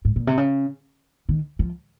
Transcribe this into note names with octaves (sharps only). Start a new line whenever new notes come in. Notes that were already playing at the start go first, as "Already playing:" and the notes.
G#2
A#2
C3
C#3
D#3
F3